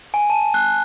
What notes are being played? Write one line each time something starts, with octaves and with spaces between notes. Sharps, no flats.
G#5
A5
F#6